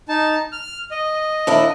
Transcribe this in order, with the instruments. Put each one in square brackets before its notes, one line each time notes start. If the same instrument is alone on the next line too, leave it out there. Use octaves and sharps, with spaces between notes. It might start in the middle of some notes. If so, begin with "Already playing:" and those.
[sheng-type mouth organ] D#4 A5
F6
D#5
[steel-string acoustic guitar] D#2 D4 E4